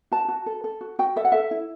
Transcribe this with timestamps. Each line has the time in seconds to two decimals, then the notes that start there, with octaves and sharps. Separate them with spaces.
0.12 F#4 A5
0.28 F#4
0.46 A4
0.64 A4
0.81 F#4
0.99 F#4 G5
1.16 A4 E5
1.25 F#5
1.32 A4 E5
1.51 E4